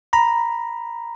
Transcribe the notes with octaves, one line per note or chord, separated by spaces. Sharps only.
A#5 B5